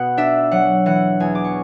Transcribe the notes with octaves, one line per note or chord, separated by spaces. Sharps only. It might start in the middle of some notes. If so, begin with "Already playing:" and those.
Already playing: B2 B3 F#5
D4 E5
F#3 F#5
E3 F#5
E2 G#5
D6
C#6